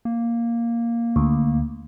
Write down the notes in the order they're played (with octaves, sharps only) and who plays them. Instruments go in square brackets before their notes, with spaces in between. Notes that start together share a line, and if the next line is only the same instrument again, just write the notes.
[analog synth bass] A#3
[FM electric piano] D2